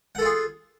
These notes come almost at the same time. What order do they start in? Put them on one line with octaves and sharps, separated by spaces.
F#5 A4 F4 G#4